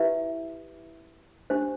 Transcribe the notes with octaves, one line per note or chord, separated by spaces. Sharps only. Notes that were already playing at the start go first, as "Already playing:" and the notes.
Already playing: E4 G4 B4 E5
D4 G4 C5